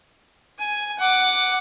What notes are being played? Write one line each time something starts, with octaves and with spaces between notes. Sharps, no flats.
G#5
F#5 D6